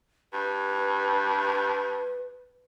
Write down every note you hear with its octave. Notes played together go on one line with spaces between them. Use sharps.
G2 B4